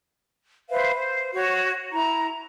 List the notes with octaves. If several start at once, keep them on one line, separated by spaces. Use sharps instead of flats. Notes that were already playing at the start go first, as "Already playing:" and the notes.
B4 C5 E5 F5
C5
F#4 C#5
E4 A#5